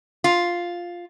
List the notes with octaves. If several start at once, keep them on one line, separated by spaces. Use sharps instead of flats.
F4